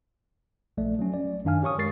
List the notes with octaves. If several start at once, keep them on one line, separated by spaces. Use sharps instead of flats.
A#1 A3 D5
F#3 C#4
D5
F#2 D#3 D4 F5 G#5 F6
G4 C#5 C#6 D#6
G#3 A#4 C#6 A6 C7